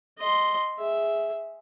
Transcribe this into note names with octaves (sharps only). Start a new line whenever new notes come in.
D#5 C6
G#4 E5